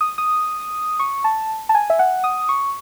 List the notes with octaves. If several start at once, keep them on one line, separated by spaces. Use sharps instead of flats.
D#6
D#6
C#6
A5
A5
G#5
E5
F#5
D#6
C#6